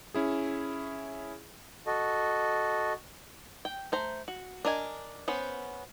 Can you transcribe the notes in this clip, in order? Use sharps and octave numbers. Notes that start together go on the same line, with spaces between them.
C#4 E4 G#4
F#4 A4 D#5
G5
A3 C5 A#5
F#4
D4 A#4 D#5 G#5
B3 C#4 C5